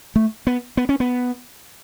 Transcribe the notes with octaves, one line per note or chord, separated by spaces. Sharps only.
A3
B3
B3
C#4
B3